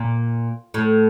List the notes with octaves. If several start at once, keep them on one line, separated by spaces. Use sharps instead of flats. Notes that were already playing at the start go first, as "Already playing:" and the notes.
Already playing: A#2
A2